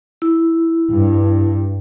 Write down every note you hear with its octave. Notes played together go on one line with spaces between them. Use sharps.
E4
G2